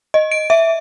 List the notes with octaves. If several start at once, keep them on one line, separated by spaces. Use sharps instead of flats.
D#5
D7
E5